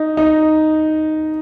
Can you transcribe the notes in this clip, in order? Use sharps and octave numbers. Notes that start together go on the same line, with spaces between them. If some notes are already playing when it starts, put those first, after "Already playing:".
Already playing: D#4
D#4